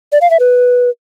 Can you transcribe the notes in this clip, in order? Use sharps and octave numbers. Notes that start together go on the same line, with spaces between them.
D5
F5
E5
B4